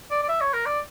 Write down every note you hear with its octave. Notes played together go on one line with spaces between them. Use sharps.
D5
D5
E5
C#5
A#4
D5